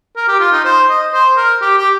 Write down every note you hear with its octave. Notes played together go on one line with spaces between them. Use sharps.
A#4
G4
F4
D#4
C5
D#5
C5
A#4
G4
G4